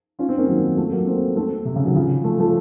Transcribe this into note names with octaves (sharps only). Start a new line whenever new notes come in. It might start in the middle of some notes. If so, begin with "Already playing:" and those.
C#4 F4
C4 D#4
A#3 C#4
D#3 F#3
F3 A3
F#3 A#3
A3 C4
A3 C4
C3
C#3
D#3 F#3
C#3 F3
F3 A3
F3 A3